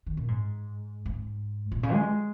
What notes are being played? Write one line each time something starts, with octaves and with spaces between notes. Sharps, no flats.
D#3
A#2
G#2
G#2
A#2
C#3
G#3